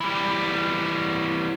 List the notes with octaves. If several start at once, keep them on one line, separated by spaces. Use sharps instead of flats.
E3 G3